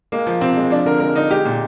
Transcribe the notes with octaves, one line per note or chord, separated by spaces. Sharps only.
G#3 A#3
F3
C3 C4
G#3
F3 D4
D3 A#4
G#3 A#4
D3 D#4
G#3 G4
A#2